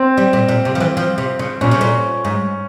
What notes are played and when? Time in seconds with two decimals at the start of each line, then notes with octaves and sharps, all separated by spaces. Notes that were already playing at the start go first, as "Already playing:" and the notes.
Already playing: C4
0.17 G3
0.33 A#2
0.48 A#2
0.65 C3
0.75 F3
0.80 E3
0.97 F3
1.18 C3
1.39 C#3
1.61 A#2 C#4
1.71 C3
1.81 A#2
2.25 G#2